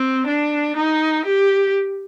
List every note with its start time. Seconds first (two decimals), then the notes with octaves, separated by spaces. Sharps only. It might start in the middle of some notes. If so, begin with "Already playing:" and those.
Already playing: C4
0.27 D4
0.76 D#4
1.25 G4